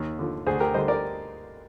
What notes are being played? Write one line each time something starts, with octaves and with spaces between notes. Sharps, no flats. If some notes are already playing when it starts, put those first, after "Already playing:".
Already playing: D#2
D3 F3
D2 G#4 C5
G4 A#4
D3 G3 C5 D#5
A#4 D5